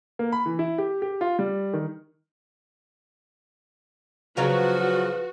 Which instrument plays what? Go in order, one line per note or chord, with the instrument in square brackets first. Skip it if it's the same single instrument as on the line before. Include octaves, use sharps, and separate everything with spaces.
[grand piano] A#3
B5
E3
E4
G4
G4
F4
G3
D#3
[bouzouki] C#3 F#3 F5 [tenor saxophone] F3 [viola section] F#4 [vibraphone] B4